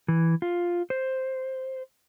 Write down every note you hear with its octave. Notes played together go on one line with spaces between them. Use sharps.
E3
F4
C5